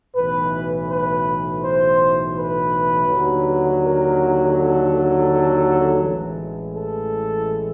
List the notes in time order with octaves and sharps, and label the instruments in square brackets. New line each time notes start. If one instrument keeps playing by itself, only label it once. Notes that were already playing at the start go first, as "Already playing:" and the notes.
[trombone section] B1 A2 E3 B4
B4
C5
B4
D#2 D3 F#3
A#4
A4
A1 A2 E3 G#3
A4